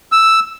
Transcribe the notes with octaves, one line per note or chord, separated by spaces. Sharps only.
E6